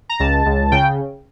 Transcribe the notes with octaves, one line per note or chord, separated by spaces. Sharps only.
A#5
C#2 A5
C#2
C#3 G5